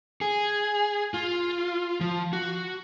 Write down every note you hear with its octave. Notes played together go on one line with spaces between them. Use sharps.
G#4
F4
F3
F#4